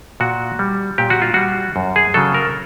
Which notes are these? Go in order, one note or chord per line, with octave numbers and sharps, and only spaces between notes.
A#2 F#4
G3
A#2 G4
F#4
F4
G3 F#4
F#2
G#4
C#3 F#3 A4
A#4